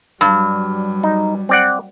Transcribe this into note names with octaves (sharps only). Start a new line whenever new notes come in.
G2 F#3 G3
D#4
C4 D5 F#5